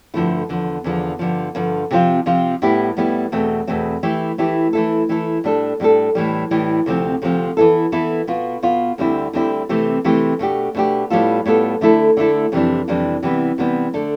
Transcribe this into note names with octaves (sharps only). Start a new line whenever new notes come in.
G2 D3 F3 A3 E4
E2 D3 F3
E2 D3 F3
G2 D3 F3
G2 D3 F3
C3 F3 C4 F4
C3 F3 C4 F4
A2 G3 B3 E4 G4
A2 G3 B3 E4 G4
E2 B2 A3 C4
E2 B2 A3 C4
E3 A3 E4 G4
E3 A3 E4 G4
E3 A3 E4 A4
E3 A3 E4 A4
A2 G3 D4 A4
A2 G3 D4 A4
A2 E3 G3
A2 E3 G3
D2 C3 F3 C4
D2 C3 F3 C4
E3 B3 E4 A4
E3 B3 E4 A4
B2 B3 F4
B2 B3 F4
D2 D3 G3 C4 E4
D2 D3 G3 C4 E4
C3 E3 A3 C4 G4
C3 E3 A3 C4 G4
B2 A3 D4 G4
B2 A3 D4 G4
A2 G3 B3 F4 A4
A2 G3 B3 F4 A4
D3 A3 E4 A4
D3 A3 E4 A4
F2 C3 E3 G3 D4
F2 C3 E3 G3 D4
C3 E3 G3 B3
C3 E3 G3 B3
D3 A3 D4 A4